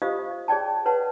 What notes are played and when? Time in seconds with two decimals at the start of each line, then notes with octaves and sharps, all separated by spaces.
0.02 F4 G4 C5 D#5 F5 D#6
0.31 D#5
0.48 G#4 C#5 D5 G5 A5
0.86 B4 C#5 F#5 A5